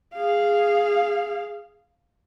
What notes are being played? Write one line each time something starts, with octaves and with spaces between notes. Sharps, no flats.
G#4 F5